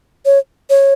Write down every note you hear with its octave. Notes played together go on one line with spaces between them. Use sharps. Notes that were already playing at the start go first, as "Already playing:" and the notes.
C#5
C#5